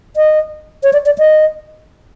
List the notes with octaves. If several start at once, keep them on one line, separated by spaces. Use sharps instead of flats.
D#5
C#5
D5
D5
D#5